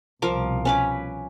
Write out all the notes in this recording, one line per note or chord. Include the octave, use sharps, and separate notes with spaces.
C2 B2 F3 A#4 D6
C#4 B4 D6